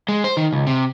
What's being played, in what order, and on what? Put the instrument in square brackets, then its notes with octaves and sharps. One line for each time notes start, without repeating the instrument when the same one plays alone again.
[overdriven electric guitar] G#3
C5
D#3
C#2
C3